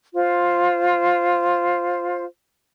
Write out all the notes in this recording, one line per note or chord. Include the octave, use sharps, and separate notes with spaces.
F4 C5